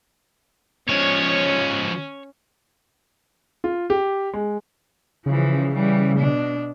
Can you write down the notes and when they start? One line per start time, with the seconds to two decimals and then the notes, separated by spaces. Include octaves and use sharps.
0.89 F3 G#3 C#4 C#5
3.64 F4
3.90 G4
4.34 G#3
5.26 C#3 E3 F3
5.74 E3 G3
6.18 B2 D4